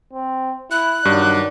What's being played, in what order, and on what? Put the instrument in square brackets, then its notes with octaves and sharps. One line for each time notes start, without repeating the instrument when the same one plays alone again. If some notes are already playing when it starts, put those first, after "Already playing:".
[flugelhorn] C4
[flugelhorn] E4 [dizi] F#6
[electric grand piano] G2 [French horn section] D#3 F#3 D4 [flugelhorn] D5